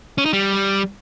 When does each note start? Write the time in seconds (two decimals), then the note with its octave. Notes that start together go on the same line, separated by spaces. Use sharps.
0.18 C#4
0.25 D#4
0.33 G3